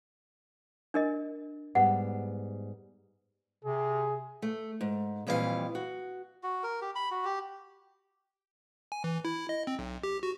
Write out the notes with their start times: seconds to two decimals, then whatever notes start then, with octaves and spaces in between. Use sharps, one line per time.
0.94 D4 A#4 D#5
1.75 G#2 G3 B3 F#5
3.64 C3 G#4
4.42 A3
4.81 G#2
5.27 F2 A#2 E3 G3 G4 F5
5.75 F#4
6.43 F#4
6.63 A#4
6.82 G4
6.95 B5
7.11 F#4
7.25 G4
8.92 G#5
9.04 E3
9.25 E4
9.49 D#5
9.67 C4
9.79 B1
10.03 G4
10.23 F#4